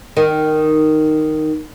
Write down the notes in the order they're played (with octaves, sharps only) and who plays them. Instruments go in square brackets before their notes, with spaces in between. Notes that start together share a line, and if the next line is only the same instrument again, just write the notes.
[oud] D#3